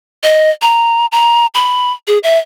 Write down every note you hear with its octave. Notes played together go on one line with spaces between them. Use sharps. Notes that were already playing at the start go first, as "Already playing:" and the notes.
D#5
A#5
A#5
B5
G#4
E5